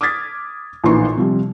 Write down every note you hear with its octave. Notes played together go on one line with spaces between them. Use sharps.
D6 D#6 F6 G#6 A6 B6
A#1 A2 E3 D#4 C6 C#6
C3 F3 G3